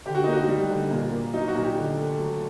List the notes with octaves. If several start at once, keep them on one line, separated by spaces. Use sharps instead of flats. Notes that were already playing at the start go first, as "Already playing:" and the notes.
D3 G4
F#4
A#3 D#4
F#4
G3
D3
A#2
A#3
F#3 D#4
F#4
A#2
G4
D3
A3
F#3